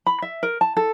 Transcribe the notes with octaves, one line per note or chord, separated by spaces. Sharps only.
B5
E5
A#4
A5
A4